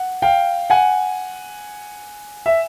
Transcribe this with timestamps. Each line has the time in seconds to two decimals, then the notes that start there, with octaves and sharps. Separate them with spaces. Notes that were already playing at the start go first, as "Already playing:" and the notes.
Already playing: F#5
0.22 F5 G5
0.70 F#5 G#5
2.46 E5